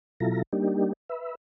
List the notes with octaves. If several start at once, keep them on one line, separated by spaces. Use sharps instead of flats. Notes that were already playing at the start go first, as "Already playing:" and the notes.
B2 F#3 E4 F4 A4 A#5
G3 A#3 D4 D#4 G4
B4 E5